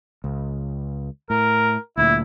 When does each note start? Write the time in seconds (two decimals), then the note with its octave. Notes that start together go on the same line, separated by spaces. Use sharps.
0.24 C#2
1.30 A2 A#4
1.98 D2 A#2 E4